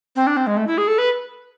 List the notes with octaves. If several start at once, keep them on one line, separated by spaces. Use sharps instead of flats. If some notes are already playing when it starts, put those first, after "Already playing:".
C4
D4
C4
G#3
A3
E4
G#4
A4
B4